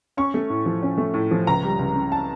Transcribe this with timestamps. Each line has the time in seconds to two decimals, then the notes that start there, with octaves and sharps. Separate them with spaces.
0.17 C#4 C#6
0.34 A3
0.50 A2
0.66 F3
0.83 C#4
0.98 A3
1.14 A2
1.31 F3
1.47 C#2 A#5
1.63 G3
1.79 C#2
1.95 C#3
2.12 A5